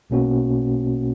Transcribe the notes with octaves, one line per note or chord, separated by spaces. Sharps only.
B1 B2 A#3 C#4 F#4